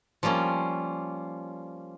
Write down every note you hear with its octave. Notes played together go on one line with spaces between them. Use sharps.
F3 G3 A#3 C#4 F4